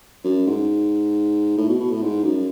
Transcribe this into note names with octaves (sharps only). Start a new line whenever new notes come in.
F#2
G#2
A2
B2
B2
A2
G#2
F#2